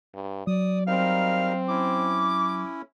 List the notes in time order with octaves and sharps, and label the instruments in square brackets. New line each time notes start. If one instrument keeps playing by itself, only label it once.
[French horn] G2
[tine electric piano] F#3 [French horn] D5 [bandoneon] D#6
[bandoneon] G3 D#4 A#4 [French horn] C4 [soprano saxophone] F5
[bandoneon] C#4 E4 [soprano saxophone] D6